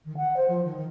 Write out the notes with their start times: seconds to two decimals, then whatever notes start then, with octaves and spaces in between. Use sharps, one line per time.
0.05 D#3
0.17 F#5
0.36 C5
0.48 F3
0.64 D#3